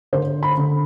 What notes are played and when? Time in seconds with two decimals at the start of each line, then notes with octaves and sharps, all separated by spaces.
0.13 D3 C5
0.43 B5
0.58 D3